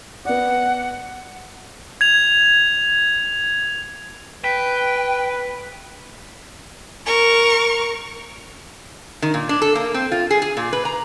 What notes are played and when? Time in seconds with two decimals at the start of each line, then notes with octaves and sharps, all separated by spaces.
0.25 B3 D5 F#5
2.01 G#6 F7
4.44 B4 G5 B6
7.06 A#4 C#6
9.22 D#3
9.34 A#2
9.49 D4
9.62 A4
9.75 A#3
9.94 C4
10.12 F4
10.31 G#4
10.42 G#4
10.57 A#2
10.73 B4
10.85 A#5